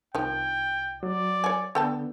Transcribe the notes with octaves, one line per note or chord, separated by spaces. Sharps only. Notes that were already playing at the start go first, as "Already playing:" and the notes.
C2 D#3 F3 G5
F#3 D5
C#5 G#5
D3 B3 D4 A4 G5 A5